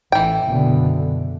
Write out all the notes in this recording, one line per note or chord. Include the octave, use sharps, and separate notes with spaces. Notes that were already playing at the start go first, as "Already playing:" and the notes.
A1 E3 G5
F#1 B2 D3